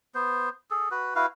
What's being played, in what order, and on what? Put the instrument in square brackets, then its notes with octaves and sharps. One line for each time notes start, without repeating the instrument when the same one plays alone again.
[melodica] B3 C5
G#4 A4
F#4 B4
E4 F#4 B4 F5